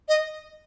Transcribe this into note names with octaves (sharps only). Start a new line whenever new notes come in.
D#5